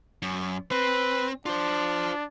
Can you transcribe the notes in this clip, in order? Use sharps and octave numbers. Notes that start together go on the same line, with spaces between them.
F#2
C4 B4
D4 F4 C5